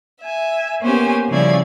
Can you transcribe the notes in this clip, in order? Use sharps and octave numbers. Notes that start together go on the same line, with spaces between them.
E5 G#5
A#3 B3 C#4 G4 C5 G#5
C#3 F3 G3 E4 D5 G#6